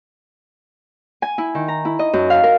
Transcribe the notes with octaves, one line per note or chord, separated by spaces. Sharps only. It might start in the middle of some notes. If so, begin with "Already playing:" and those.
G#5
E4
D#3
A#5
E4
D#5
F#2
F5
A#4